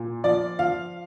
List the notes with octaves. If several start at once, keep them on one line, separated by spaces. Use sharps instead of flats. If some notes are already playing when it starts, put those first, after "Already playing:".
Already playing: A#2
F3 D5
F3 F5